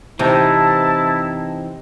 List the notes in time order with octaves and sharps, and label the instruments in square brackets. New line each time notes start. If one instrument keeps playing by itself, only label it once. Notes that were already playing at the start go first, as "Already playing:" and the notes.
[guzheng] C3 [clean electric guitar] E3 C4 D#4 [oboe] E4 [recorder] A5